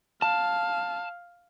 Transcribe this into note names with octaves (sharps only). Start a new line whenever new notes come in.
F5 A5